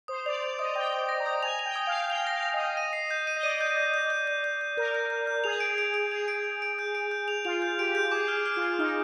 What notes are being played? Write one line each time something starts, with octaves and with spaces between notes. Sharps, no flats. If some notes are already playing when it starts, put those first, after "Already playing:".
C5 D#6
D5 F7
D5 F7
D#5 D#6
G5 D#6
D#6
A#6
A#5
D#6
G#5 F7
F7
G5
D#6
F5
F7
G5 F7
F5 A#6
A#6
D#5
D#6
D#7
C7
G6
D#7
D#5
D5 D#7
G6
G6
G6
G6
G6
G6
G6
A#4 G6
G6
G6
G6
G#4 F7
D7
D7
D7
G#4 F7
D7
D7
D7
G6
D7
G6
F7
F4 F7
G6
G4 D7
G6
G#4 D6
F6
G#4
F6
F4
F6
D#4 F6